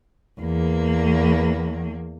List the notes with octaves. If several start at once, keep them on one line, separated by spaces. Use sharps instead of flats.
E2 A#3